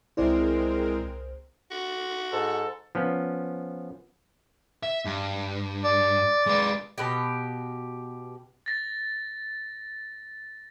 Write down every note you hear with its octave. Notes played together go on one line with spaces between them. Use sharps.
C2 G#3 C4 E4 A#4 C5 D5
F#4
G#2 A4
F3 B3 C#4
E5
G2
D5
G#3 B4
B2 G4
A6 A#6